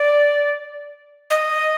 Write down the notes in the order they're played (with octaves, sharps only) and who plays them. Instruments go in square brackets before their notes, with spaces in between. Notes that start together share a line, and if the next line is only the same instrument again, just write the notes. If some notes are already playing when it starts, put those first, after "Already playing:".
Already playing: [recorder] D5
D#5